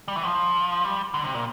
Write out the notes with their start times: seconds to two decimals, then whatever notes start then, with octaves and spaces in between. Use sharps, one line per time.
0.08 G3
0.16 E3
0.23 F3
0.84 G3
1.14 D3
1.24 C3
1.34 A#2